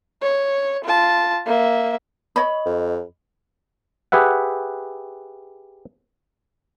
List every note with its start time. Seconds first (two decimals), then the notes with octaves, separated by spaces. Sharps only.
0.22 C#5
0.84 F4 A5
1.46 A#3 E5
2.36 C#5 D#5 B5
2.66 F2
4.12 G4 G#4 B4 E5 F#5